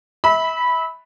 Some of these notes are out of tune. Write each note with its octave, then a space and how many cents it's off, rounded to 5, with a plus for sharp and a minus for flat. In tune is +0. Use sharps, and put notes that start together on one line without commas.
E5 -30 B5 +0